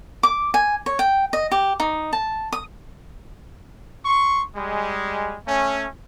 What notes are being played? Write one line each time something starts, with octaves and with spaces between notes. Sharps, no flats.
D6
G#5
C#5
G5
D#5
G4
D#4
A5
D#6
C6 C#6
G3 G#3
A3 C#4